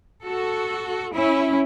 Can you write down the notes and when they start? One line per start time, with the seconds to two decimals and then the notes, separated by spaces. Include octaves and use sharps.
0.24 F#4 A4
1.13 C#4 E4